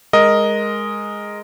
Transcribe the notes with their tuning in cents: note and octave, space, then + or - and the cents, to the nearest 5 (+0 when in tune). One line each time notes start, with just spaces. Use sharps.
G#3 +0 A#4 +0 D#5 +0